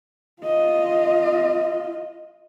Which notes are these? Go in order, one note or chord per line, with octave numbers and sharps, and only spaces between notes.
F4 D#5